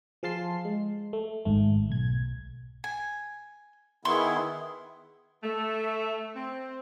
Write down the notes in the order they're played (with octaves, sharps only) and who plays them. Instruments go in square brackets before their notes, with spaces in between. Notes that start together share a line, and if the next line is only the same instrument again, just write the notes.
[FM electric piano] F3 G#4 F5 A5 C6 C7
G#3
A3
G#1 G#2 A3
B1 G#6
[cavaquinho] G#5
[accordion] D#3 B3 E4 [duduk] G#4 [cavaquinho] C6 C#6
[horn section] A3
C4